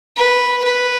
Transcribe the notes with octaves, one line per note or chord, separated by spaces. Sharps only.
B4
B4